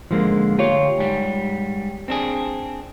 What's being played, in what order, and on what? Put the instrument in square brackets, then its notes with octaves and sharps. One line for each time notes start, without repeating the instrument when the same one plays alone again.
[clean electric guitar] G#2 D3 [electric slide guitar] F3 G#3 A#3
[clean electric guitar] D2 F4 [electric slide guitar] G4 C#5
[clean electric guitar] G#2 G3
C4 D4 G#4